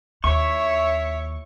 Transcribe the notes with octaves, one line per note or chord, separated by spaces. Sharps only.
D#2 E4 C#5 E5 C#6